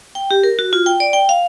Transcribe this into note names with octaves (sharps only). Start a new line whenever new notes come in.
G5
G4
A#4
F#4
F4
G5
D5
G5
F5